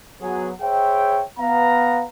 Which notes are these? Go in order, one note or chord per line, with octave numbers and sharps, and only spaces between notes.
F#3 B3 G#4
G#4 C5 C#5 E5 G5
B3 F5 A#5